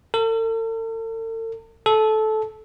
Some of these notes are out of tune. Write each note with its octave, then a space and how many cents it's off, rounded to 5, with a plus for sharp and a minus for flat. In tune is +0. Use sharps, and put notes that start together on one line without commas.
A4 +45
A4 -15